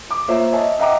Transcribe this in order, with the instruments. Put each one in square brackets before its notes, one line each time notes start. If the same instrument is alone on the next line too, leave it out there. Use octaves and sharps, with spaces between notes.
[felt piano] D6
A#3 F4 C5 C#5 E5
C#5 D#5 E5 G#5 A5
D#5 E5 F#5 G5 A#5 D6